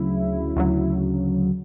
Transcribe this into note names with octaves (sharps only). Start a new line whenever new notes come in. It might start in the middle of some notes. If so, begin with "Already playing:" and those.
Already playing: D2 C#3 F#3 E4
D2 C#3 F#3